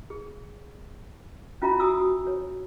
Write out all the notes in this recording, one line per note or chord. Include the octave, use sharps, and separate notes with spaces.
G#4
C#4 F4 F#4 E5 A#5 B5
F#4 G#5 D#6 E6
C#5